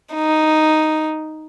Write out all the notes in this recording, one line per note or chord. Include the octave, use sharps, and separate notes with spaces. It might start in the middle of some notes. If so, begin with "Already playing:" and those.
D#4